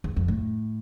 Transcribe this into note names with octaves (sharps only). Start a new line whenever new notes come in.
E2
F2
A2